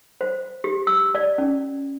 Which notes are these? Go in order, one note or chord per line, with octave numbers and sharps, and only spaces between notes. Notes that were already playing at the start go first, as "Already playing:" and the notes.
C5
G4
E6
D5
C#4